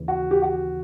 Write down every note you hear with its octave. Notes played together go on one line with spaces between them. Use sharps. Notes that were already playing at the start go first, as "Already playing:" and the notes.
Already playing: D#2 C#3 E3
F#4
G4
F#4